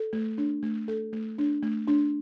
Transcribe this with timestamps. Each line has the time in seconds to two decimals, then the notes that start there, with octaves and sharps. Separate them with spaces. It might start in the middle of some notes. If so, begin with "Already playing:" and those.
Already playing: A4
0.13 A3
0.38 D4
0.63 A3
0.88 A4
1.13 A3
1.38 D4
1.63 A3
1.88 D4